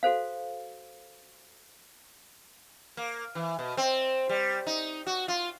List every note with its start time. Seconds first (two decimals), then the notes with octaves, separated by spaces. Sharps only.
0.03 F#4 A4 C5 F5
2.97 A#3
3.35 E3
3.59 B2
3.77 C4
4.29 G3
4.67 D#4
5.07 F#4
5.28 F4